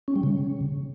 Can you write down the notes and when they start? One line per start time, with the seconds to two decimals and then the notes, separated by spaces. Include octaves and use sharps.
0.08 C#4
0.16 G3
0.23 C#3